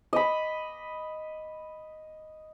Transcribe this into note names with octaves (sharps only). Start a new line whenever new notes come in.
D#5 B5